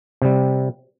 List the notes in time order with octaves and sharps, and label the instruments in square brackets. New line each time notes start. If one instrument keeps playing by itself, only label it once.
[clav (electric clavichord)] C3 G3